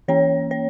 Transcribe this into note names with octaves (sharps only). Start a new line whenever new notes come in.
E3 A#3 C#4 C#5
C#5